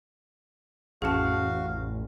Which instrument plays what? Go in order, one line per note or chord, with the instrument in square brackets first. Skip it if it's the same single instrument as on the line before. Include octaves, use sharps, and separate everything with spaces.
[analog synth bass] A1 [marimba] F2 C#4 [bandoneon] F#4 F5 [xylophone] G#4 A5